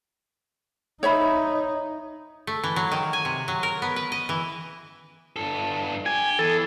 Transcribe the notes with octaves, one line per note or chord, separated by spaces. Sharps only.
D#4 C#5 E5 B5
A3
E3
F#3
D#3
G#5
C3
F#3
A#4
B3
B4
D#5
E3
G2 A4
G4 G#5
E3 G#4 A4